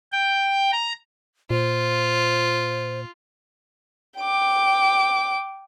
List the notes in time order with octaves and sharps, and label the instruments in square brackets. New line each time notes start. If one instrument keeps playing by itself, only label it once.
[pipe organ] G5
A#5
[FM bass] A#2 [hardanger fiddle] F4 [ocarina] C5
[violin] G5 D6